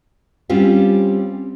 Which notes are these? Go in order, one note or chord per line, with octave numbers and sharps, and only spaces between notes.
G3 C4 C#4 F4 G4